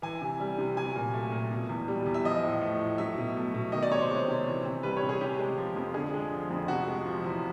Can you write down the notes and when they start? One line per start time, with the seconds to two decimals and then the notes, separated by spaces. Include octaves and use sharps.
0.02 E3 G#5
0.21 C3
0.40 G3
0.58 C3
0.77 F#3 G#5
0.96 A#2
1.14 A3
1.32 A#2
1.51 B2
1.69 E2
1.88 G3
2.06 E2
2.14 E5
2.25 F3 D#5
2.43 A2
2.61 A3
2.80 A2
2.98 F#3 E5
3.18 B2
3.36 A3
3.54 B2
3.72 D#3 D#5
3.83 D5
3.91 C3 C#5
4.01 C5
4.10 G#3
4.28 C3
4.47 E3
4.65 C3
4.83 G3 B4
4.97 C#5
5.03 C3
5.09 G#4
5.21 C3 G4
5.39 G#3
5.57 F3
5.76 F2
5.94 D3 G#4
6.14 G#3
6.31 F3
6.50 F2
6.68 C3 F#4
6.88 G#3
7.05 F3
7.24 E2